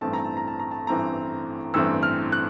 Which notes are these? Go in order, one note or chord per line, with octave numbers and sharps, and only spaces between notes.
A1 G2 E3 A3 C4 A5
A#5
A5
A#5
A5
A#5
A5
A1 G2 E3 A3 C4 A#5
A1 G2 E3 A3 C4 E6
F6
F#6